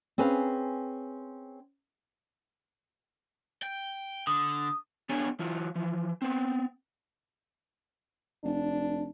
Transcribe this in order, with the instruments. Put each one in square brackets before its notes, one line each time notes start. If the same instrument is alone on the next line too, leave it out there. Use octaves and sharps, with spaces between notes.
[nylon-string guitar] C4 C#4 G#4 B4 F5
[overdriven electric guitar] G5
[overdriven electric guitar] D3 [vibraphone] D#6
[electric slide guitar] B3 D4 G#4 C#5 G#5
E3 F#3 F4
E3 F3
B3 C4
[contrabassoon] F1 [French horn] D4